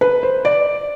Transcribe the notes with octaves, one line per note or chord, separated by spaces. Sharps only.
B4
C5
D5